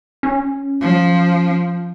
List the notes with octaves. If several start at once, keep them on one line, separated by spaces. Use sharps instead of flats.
C#4
F3